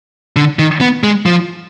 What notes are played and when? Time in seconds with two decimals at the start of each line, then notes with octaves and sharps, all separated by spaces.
0.36 D3
0.59 D#3
0.81 B3
1.03 G#3
1.26 F3